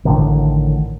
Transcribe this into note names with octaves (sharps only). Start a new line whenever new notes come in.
A1 A2 D3 D#3